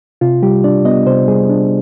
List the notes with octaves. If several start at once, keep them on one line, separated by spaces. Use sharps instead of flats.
C3 F4
G3 G4
D4 D5
B3 D#5
C3 C5
G3 G#4
D4